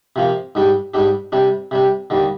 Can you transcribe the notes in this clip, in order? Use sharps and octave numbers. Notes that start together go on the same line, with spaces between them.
C3 F3 A#3 F4
G#2 G3 D4 G4
G#2 G3 D4 G4
C3 G3 D4
C3 G3 D4
D#2 D3 G3